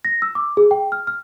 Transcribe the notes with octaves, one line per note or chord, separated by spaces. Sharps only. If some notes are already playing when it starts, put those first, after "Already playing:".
A#6
E6
D6
G#4
G5
F6
F6